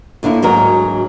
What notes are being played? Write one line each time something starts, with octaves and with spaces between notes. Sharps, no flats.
A2 D3 A#3 E4
D2 G#2 F#3 A#4